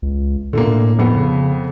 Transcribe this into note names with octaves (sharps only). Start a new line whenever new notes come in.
C#2
A#2 D3 A3 A#3
A2
F2 A2 B3
C#3